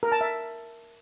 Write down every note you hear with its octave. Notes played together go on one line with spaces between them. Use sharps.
A#4
A5
E5